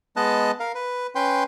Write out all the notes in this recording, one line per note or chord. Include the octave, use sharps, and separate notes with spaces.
G#3 B3 D#5 A5 F#6
A#4 F5
B4
C#4 B4 G5 C6